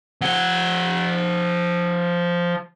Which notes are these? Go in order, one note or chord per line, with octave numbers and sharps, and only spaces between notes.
F3 F#5